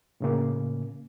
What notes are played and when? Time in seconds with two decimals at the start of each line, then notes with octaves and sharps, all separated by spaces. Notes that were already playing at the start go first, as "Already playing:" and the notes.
0.20 A2 C#3 A#3